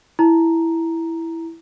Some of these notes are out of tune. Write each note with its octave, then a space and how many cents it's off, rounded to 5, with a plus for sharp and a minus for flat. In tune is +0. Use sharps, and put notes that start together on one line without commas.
E4 +0 A#5 +0